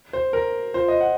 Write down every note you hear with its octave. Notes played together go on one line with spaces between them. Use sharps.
C5
A#4
F4 C5
D#5
F#5